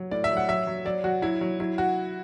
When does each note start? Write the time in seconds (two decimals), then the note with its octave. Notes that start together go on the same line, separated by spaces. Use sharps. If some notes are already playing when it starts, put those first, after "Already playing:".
Already playing: F#3
0.11 A2 D5
0.24 E5
0.30 F#3
0.37 F#5
0.49 F#3 E5
0.67 F#3
0.85 F#3 D5
1.04 F#3 F#4
1.22 F#3 E4
1.41 F#3
1.60 F#3 E4
1.78 F#4